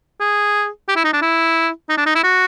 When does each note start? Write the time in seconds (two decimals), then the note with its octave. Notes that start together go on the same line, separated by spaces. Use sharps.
0.20 G#4
0.88 G4
0.96 E4
1.04 D#4
1.13 D4
1.22 E4
1.89 D#4
1.97 D4
2.06 D#4
2.15 E4
2.24 F#4